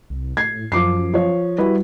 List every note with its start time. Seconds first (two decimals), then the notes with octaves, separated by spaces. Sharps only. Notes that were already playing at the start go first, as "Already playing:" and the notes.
0.10 C2
0.37 A2 G#6 C7
0.72 F#2 F3 D6 C7
1.14 F3 C#5
1.58 G3 E4 F#4 B4